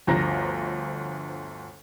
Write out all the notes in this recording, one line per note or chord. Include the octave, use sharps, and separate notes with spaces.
G1 D2 F3 A#5 A#6